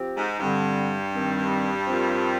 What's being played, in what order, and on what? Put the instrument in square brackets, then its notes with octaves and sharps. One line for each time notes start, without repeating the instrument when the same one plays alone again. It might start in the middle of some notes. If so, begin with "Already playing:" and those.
Already playing: [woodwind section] F3 C4 G4
[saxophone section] G#2
[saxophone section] G2 [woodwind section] D3 G3 C4
[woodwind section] D#3 G3 C4
F3 C4 F4 A#4